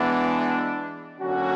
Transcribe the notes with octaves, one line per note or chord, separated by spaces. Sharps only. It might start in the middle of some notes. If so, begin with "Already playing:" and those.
Already playing: E3 G#3 B3 D4
D3 F#3 A#3 C#4 F#4